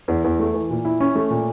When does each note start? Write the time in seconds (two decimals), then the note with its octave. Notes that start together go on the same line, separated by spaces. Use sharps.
0.08 E2
0.24 E2
0.40 A3
0.54 E3
0.70 A#2
0.85 E4
1.00 C#4
1.15 A3
1.30 A#2